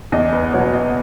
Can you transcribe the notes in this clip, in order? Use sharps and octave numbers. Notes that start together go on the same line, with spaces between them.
E2 D#5
B4
B2 F#3 B3 C#5
D#5